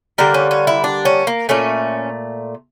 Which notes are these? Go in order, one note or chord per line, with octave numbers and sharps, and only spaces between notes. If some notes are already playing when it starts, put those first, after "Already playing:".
D3 G3 A#3 A#4
C#4
C#4
E4
D4
C#4
A#3
A#2 A3 C#4